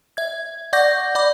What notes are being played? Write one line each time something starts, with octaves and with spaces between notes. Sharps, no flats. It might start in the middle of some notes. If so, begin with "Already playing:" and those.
E5 G#6
D5 F#5 C#6 D6 G6 A#6
D5 B5 D6